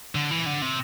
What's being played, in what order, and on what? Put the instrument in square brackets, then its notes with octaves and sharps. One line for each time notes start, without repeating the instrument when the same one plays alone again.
[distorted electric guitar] D3
E3
D3
C3